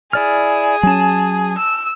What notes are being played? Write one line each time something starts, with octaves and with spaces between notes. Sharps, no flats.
E4 G#4 D5 F6
F#3 C#4 G#5 A5
E6